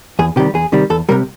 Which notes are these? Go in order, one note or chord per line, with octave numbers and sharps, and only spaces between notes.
E2 G#4
C3 D#3 G3 G4
E2 G#4
C3 D#3 G3
E2 A4
C3 D#3 G3 A#4